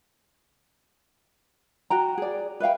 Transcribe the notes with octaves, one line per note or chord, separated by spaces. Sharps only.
F#4 G5 A#5
G#4 D5
B4 E5 F5 G5